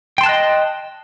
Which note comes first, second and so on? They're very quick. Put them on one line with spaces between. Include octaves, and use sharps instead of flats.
G5 C6 A5 F#6 D#5